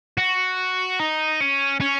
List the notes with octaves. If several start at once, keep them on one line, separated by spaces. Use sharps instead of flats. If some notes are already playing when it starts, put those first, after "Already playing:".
F#4
D#4
C#4
C#4